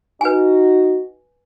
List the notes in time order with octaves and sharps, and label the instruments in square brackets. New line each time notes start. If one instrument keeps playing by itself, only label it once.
[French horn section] D#4 F#4 [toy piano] B4 G#5